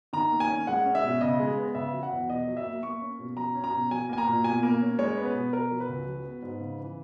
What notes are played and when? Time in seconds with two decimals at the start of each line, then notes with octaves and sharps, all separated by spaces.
0.13 D#3 A#5
0.32 A#3
0.40 G#5
0.49 C#4
0.67 G#3 F#5
0.86 C#4
0.95 E5
1.04 B2
1.21 C#3 D#5
1.39 G#3
1.58 B3
1.75 C#3 E5
1.93 F#3
2.03 F#5
2.11 E2
2.29 B2 D#5
2.47 F#3
2.57 E5
2.65 A#3
2.83 A#3 C#6
3.01 C#4
3.19 B2
3.36 F#3 A#5
3.55 C#4
3.64 A#5
3.72 B2
3.91 F#3 G#5
4.09 A#3 G#5
4.18 A#5
4.27 A#2
4.44 B2 G#5
4.63 A#3
4.81 C#4
4.99 G#3 C#5
5.17 B3
5.25 B4
5.34 B2
5.53 B2 A#4
5.71 F#3
5.80 B4
5.89 C#2
6.06 F#3
6.25 B3
6.42 G#2
6.60 C#3
6.79 E3